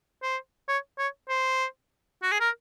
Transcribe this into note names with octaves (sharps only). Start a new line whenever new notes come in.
C5
C#5
C#5
C5
F#4
G#4
A#4